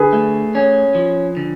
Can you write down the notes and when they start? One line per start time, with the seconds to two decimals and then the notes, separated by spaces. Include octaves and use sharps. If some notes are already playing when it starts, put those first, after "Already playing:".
Already playing: D3 G#4 B4
0.13 A3
0.55 C#4
0.95 F3
1.37 D3